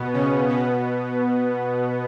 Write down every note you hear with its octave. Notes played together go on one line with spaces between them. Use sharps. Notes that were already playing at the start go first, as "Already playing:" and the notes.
Already playing: B2 B3
C#3 C#4
B2 B3